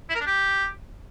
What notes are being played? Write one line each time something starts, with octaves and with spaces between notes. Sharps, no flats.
E4
A#4
D4
G4